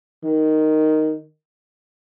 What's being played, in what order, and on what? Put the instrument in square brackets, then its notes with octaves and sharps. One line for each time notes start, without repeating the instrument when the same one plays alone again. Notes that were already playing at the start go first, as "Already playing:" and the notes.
[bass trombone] D#3